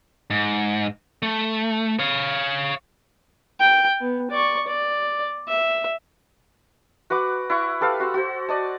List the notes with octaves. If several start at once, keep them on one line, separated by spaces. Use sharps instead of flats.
G#2
A3
C#5 F5
G5
B3
D5 C#6
D5
E5
F#4 B4 F#5 D6
E4 F#5 C#6
G4 A4 B4 F5
F#4 F#5 C6 E6
F#4 C5
D5 D#5 A5